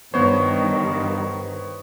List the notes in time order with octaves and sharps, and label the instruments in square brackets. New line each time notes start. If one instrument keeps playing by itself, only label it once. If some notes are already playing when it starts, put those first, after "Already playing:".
[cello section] G2 D#3 [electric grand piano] B3 C5 [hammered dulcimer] C#5